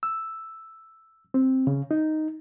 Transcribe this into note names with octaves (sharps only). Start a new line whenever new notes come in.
E6
C4
C#3
D#4